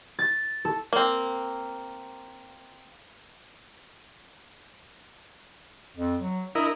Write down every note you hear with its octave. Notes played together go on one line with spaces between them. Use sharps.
A6
A4
A#3 C4
F2
F#3
D4 E4 A#4 D#5